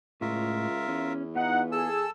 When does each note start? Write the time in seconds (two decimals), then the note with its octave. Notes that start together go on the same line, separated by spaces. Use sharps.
0.21 C#2 A2 F4 A#4 E5
0.88 E2 C#4
1.35 B3 D#4 F4 F#5
1.72 G#4 A4 A5 E6